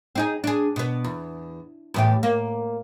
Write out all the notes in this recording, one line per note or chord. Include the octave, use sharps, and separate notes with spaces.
C4 D#4 G#4
D4 G#4
B2 B3
E2
E2 A2 G4
A#3